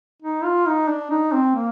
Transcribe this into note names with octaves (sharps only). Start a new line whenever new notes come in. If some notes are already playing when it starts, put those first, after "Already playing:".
D#4
F4
D#4
D4
D#4
C4
A#3